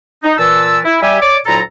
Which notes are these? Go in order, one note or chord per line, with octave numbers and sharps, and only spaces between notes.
D#4
A#2 E3 A5 E6
E4
G3 G4 E5 G#5
C#5 D5 D6
D2 A#2 F#3 E4 A4 A#5